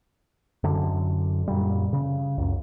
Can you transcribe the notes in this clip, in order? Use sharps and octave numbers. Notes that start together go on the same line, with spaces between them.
F#2 D3
F#2 A#2 G3
C#3
C#2 F#2